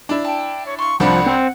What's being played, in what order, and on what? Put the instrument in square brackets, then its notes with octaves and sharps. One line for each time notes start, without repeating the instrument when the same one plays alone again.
[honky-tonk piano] D4 E4
[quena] G5 [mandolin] A5
[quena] C#5
[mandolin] F5 C6 [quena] C#6
[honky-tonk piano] C2 D4 [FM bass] F3 [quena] F#5 [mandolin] B5 C#6
[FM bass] C4